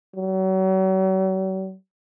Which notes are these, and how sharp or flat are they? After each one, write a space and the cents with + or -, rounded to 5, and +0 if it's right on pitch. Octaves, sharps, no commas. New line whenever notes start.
F#3 +40